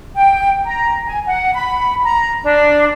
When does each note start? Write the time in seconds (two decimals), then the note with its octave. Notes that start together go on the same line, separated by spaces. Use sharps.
0.15 G5
0.65 A#5
1.06 G#5
1.25 F#5
1.56 B5
2.04 A#5
2.44 D4